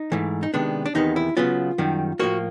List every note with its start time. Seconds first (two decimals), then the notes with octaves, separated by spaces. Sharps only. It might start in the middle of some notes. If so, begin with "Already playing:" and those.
Already playing: D#4
0.12 G#2 E3 A3
0.43 D#4
0.54 C3 D#3 G#3 B3 D4
0.86 D4
0.95 E2 C3 D#3 G3 B3 D#4
1.16 E4
1.37 C#3 F#3 B3 F4
1.78 F#2 D#3 G3
2.19 A2 F3 A#3 F#4